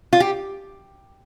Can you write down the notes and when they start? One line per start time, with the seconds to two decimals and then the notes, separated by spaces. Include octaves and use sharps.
0.13 F4
0.20 G4